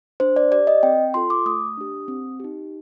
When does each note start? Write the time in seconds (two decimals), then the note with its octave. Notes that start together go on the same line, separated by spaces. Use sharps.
0.20 D4 C5
0.36 D5
0.52 G4 D5
0.67 D#5
0.83 C4 G5
1.14 F4 A4 C6
1.30 D6
1.46 A3 D#6
1.77 D4 G4
2.08 C4
2.40 D#4 G4